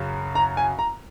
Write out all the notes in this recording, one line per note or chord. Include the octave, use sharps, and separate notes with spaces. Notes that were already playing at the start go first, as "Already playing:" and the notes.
Already playing: F#2 C#3 F#3
A#5
G#5
A#5